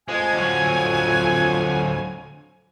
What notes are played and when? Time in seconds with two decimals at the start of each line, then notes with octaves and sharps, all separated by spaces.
0.08 F2 F3 G#3 G#5
0.33 D2 F#3